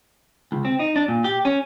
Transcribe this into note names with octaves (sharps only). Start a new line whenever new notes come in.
C#2
C4
D#4
D4
A#2
G4
C#4